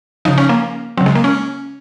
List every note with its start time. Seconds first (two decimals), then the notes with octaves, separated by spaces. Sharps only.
0.25 C#3 F3 D#4
0.38 C#4
0.49 A#3
0.98 F#3 C4
1.01 C#3
1.06 G#3
1.15 A#3
1.24 C#4